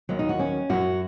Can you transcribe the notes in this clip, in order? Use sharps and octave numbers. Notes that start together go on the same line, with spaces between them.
D#2 D#3 F#3
D#4
F#4
C#4
F#2 F#3 F#4